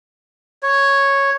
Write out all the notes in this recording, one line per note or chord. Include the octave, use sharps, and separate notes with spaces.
C#5